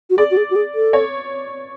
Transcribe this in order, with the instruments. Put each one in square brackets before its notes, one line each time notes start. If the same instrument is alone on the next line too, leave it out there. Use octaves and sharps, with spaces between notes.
[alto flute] F#4
[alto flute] G#4 [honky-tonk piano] D5
[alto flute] F#4
G#4
F#4
G#4
A4
[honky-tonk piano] C#5